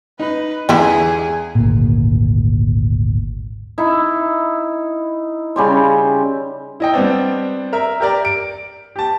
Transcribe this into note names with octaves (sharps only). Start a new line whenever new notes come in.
D#4 B4
E2 D3 G3 E4 G#4
G#1 D2 A#2
D#4 E4
C#3 G3 C6
E4 D#5 G5
G3 B3 C4 D4
A#4 E5
G4 A#4 D5
D7
G4 A5